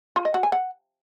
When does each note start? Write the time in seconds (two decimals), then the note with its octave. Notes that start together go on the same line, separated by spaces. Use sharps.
0.16 F4
0.25 D#5
0.34 F#4
0.43 G#5
0.52 F#5